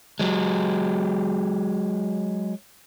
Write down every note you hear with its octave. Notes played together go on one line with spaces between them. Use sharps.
F#3 G#3